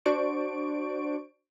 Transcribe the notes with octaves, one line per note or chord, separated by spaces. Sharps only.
D4 F#4 C5 D5 C#6 D7